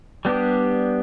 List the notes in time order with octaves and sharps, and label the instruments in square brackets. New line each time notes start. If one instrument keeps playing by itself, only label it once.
[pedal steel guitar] G3 B3 D4 G4